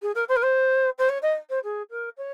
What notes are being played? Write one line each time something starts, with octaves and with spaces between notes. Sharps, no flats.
G#4
A#4
C5
A#4
C5
C5
C#5
D#5
C5
G#4
A#4
C#5